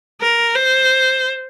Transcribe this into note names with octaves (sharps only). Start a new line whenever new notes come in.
A#4
C5